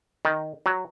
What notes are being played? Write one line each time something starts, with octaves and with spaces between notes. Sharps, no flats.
D#3
F#3